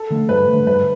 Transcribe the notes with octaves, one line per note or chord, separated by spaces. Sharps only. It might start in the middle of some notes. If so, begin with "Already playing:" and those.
Already playing: A4
D3 A3
G2 B4
D3 A3
G2 B4